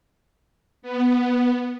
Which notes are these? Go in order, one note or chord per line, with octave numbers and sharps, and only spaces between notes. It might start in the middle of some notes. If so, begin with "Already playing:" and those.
B3